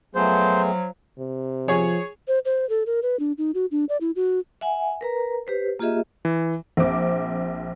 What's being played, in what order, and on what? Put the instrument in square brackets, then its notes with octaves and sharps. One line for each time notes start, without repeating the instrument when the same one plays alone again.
[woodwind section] F3 F#3 [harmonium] A3 B3 G#4 [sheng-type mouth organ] C5
[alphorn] C3
[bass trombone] F3 [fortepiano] G#4 C#5
[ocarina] C5
C5
A4
A#4
B4
D4
D#4
F#4
D4
D5
E4
F#4
[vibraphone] E5 F#5 G#5
A#4 B4 A#5
G4 B4 C5
A#3 F4 G4 G#4 D#5 E5
[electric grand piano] E3
[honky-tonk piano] A#1 C4 D6